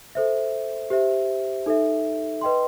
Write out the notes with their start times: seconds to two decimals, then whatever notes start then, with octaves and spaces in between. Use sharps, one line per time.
0.15 A4 C5 E5
0.90 G4 C5 E5
1.66 D#4 A4 E5
2.41 B4 D#5 G5 C6